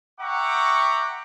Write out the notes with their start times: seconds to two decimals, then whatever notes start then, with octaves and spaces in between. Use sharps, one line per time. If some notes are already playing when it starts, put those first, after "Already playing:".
0.20 E5 F#5 G5 A#5 C#6 D6